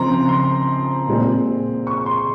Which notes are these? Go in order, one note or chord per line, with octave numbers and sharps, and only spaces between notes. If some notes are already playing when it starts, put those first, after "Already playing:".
Already playing: C#3 F3 C4 A#5 C6
C6
A#2 G#3 C4
C#6
C6